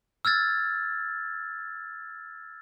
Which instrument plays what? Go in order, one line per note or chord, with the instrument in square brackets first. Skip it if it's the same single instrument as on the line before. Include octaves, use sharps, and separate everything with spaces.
[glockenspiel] E6 F6 G#6 A6